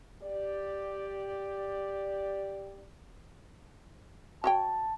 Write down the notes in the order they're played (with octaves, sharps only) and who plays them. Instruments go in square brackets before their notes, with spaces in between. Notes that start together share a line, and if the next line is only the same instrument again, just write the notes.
[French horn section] G4 D5
[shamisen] F#4 C#5 G5 [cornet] A5